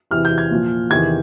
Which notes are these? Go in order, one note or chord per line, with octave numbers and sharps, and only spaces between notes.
E2 C3 E3 F6
G6
G#6
A#2 F3
E2 C3 D#3 G#6